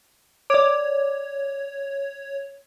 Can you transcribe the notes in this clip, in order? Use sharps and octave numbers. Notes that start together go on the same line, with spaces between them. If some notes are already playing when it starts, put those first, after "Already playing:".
C#5 D5 D6